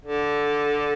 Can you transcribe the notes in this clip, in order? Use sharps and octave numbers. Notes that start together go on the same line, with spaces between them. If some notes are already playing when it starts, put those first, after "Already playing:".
D3